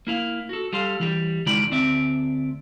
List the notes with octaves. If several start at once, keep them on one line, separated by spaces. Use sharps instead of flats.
A#3 E4 F5
F#4 A4
G3 A4 F5 C6
E3 G3 G4
C#2 D#3 G#3 E4 D5 B5
D2 C4 D5 E5